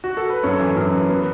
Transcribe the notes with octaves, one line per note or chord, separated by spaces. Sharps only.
F#4
A4
B4
F#2 A4 C#5
E3
F#2
E3
B3